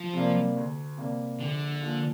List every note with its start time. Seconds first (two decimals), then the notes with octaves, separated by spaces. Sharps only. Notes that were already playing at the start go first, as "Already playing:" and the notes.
Already playing: F3
0.13 C3 G3 A#3
0.56 D2
0.97 C3 G3 A#3
1.39 A#1 D3
1.81 A#2 F3